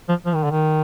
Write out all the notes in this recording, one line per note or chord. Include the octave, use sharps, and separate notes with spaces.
F3
F3
D#3
D3
D#3